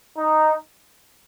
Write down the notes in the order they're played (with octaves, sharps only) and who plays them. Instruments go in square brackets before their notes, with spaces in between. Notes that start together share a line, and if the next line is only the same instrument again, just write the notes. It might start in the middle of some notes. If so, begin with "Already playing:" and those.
[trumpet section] D#4